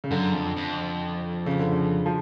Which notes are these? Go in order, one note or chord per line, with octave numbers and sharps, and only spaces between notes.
C#3
F#2 D3
F2
F2
C#3
D3
C#3
F3